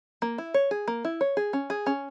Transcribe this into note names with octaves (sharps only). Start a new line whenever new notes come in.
A#3
E4
C#5
G#4
A#3
E4
C#5
G#4
C#4
G#4
C#4